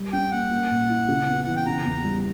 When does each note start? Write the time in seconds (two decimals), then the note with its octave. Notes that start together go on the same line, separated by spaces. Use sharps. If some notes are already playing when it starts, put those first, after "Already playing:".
Already playing: G3
0.13 C#4 G5
0.32 A#3 F#5
0.51 A#3
0.71 A#2
0.89 E4
1.08 C#3
1.28 B3
1.44 E3 F#5
1.56 G5
1.66 C#3 A#5
1.85 E2
2.04 G3